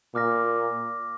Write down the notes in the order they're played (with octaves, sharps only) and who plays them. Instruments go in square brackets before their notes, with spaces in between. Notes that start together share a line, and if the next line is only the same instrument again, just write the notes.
[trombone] A#2 [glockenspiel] D6 F6 A#6